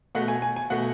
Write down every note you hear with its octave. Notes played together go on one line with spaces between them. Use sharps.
B2 A3 F#5
G#5
G#5
G#5
B2 A3 F#5